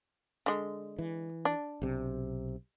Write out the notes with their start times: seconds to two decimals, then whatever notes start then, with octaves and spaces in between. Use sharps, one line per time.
0.46 D3 G#3
0.99 E3
1.45 D4
1.82 B1 C3